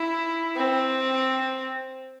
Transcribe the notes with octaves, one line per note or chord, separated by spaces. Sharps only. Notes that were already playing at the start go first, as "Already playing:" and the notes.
Already playing: E4
C4